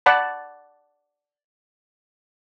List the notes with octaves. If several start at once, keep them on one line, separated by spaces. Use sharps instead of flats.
D5 F#5 A5 B5